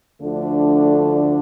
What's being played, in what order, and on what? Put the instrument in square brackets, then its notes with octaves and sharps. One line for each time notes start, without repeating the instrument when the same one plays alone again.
[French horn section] D2 D3 F3 A3 D4